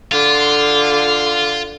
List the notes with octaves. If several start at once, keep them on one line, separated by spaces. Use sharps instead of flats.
D3 F4